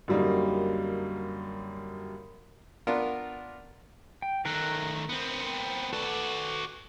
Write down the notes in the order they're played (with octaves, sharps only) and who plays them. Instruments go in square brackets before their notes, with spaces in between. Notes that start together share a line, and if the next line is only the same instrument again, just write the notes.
[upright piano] F#2 D3 F#3 G3 A#3 D#4
[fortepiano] B3 D4 F4 A#4
[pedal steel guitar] G5
[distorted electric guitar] D#3 A3 [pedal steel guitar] A#4 A#5 F#6
[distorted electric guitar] B3 C4
[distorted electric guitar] F#4 D5 [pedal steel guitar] A4 B4